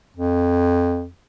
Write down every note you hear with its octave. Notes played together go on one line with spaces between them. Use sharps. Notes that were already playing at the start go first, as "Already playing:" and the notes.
F2